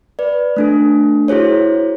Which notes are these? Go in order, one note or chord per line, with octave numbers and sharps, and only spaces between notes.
B4 D5
A3 D4 A4
E4 F#4 G#4 C5 C#5